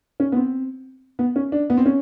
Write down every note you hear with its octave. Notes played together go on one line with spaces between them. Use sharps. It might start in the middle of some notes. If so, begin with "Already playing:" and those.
C#4
B3
C4
B3
C#4
D4
B3
C4
C#4